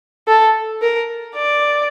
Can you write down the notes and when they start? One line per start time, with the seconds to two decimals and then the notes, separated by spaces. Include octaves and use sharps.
0.28 A4
0.82 A#4
1.36 D5